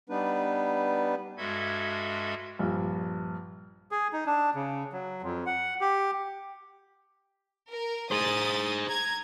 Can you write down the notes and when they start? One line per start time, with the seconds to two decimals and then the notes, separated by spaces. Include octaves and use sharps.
0.10 G3 B3 D4 D#4 B4
1.37 G2 G#3 F#4 A4 E5 G#6
2.59 A#1 G2
3.91 G#4
4.13 D#4
4.27 D4
4.55 C#3
4.92 F#3
5.22 F2
5.46 F#5
5.81 G4
7.71 A#4
8.11 G#4 C5 D#6 A6
8.87 A#5 G#6